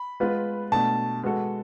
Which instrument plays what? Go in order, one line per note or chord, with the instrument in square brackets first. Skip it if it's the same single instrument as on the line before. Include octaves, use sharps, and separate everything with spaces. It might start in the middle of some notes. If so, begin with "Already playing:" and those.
Already playing: [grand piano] B5
[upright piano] G#3 B3 F4 B4
[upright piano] B2 A3 D4 [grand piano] A5
[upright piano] G#3 B3 F#4 A4